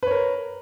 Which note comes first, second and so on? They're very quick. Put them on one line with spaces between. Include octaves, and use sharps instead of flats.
B4 C#5 A#4